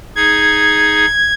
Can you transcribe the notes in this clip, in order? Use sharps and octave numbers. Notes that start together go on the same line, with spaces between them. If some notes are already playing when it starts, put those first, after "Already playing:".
D#4 G#4 G#6